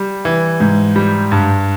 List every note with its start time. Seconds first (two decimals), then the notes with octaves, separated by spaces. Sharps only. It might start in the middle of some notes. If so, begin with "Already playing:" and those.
Already playing: G3
0.25 E3
0.60 G#2
0.96 G3
1.32 G2